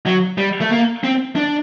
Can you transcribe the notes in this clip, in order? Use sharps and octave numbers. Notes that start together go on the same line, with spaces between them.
F#3
G3
A3
A#3
C4
D4